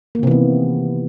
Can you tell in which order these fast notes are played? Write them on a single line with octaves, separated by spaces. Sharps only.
A#3 D#3 C3 E3 B3